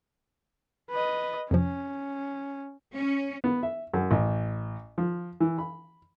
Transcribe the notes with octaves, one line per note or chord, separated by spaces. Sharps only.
B4 D#5
F2 C3 F3 C#4
C#4
B3
E5
F#2
A1
F3
E3
B5